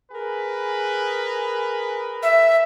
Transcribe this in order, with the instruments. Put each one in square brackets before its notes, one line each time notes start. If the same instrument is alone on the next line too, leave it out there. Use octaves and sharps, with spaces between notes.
[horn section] G#4 A#4 B4
[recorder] E5